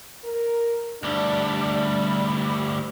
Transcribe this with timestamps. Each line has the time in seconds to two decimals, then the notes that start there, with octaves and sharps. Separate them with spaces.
0.24 A#4
1.03 D2 G3 D4